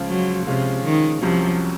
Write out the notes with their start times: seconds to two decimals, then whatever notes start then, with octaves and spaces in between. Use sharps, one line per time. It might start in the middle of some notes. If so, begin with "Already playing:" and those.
Already playing: C#2 C#3 F3
0.09 F#3
0.46 C3 F3 G#3 C#4 F4
0.84 D#3
1.22 C2 C3 F3 F#3 C#4